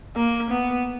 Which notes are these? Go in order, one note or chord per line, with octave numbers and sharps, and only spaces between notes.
A#3
B3